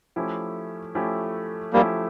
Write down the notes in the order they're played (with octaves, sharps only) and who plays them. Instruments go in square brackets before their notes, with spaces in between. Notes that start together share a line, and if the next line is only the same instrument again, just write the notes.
[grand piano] F3 A3 C#4 E4 G4
F3 A3 C#4 E4 G4
[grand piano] F3 A3 C#4 E4 G4 [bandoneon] G3 A#3